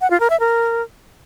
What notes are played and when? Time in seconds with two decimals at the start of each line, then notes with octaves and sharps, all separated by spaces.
0.01 F#5
0.10 F4
0.20 A#4
0.30 E5
0.40 A#4